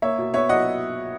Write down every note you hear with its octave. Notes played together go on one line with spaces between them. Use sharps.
A#3 C#5 E5
B2
B3 C#5 E5
F#3 D#5 F#5